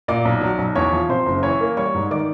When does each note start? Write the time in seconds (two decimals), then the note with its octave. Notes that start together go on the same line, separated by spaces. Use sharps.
0.08 A#2 D5 D6
0.25 B1
0.41 F#3
0.58 B1
0.76 E2 C#5 C#6
0.92 F3
1.09 C3 C5 C6
1.26 F#1
1.43 E3 C#5 C#6
1.60 A#3
1.77 G3 C#5 C#6
1.94 G#2
2.10 D#3 D5 D6